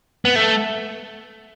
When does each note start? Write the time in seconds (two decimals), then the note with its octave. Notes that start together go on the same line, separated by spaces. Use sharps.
0.25 B3
0.36 A3